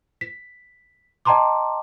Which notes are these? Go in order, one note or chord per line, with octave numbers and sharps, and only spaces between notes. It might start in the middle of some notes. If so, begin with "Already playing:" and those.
B6
D#5 G5 A5 A#5 C6 D6